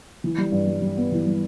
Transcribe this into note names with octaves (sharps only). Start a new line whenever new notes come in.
E3
G3
G2
G3
G3
B3
E3
G3